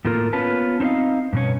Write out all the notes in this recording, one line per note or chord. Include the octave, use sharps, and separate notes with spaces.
A2 A3 A#3 F4 A#4
B3 C#4 F4 B4 A5
C4 D#4 C5 D#5 F5
G2 B2 C#4